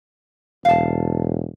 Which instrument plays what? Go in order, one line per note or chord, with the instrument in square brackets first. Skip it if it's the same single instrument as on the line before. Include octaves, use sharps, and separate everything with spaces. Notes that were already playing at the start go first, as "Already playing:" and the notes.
[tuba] E1 [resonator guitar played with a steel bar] F5 A5